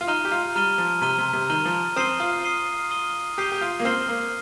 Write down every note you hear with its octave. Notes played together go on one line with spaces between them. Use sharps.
F4
D#4 A#5 F6 D#7 G7
G4
F4
G3 A#5 F6 D#7 G7
F3
C3 A#5 F6 D#7 G7
C3
C3
D#3 A#5 F6 D#7 G7
F3
C4 D#6 C7 D#7 G7
F4
D#6 C7 D#7 G7
D#6 C7 D#7 G7
G4 D#6 C7 D#7 G7
G4
F4
A#3
C4 F6 C7 G7
A#3